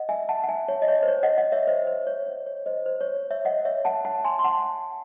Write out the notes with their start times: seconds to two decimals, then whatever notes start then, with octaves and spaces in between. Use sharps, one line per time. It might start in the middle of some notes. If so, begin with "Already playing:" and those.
Already playing: D#5 F#5
0.09 E5 G#5
0.29 F#5 A5
0.44 F#5
0.49 E5 G#5
0.68 C#5
0.82 D#5
0.88 C#5
1.03 C5
1.08 C#5
1.23 D#5 F#5
1.38 D#5 F#5
1.52 C#5 E5
1.67 C5 D#5
1.87 C5
2.07 C#5
2.27 C#5
2.47 C#5
2.66 C5 D#5
2.86 C5
3.01 C#5
3.31 C#5 E5
3.45 D#5 F#5
3.65 C#5 E5
3.85 F#5 A5
4.05 F#5 A5
4.25 G#5 C6
4.39 C6
4.44 F#5 A5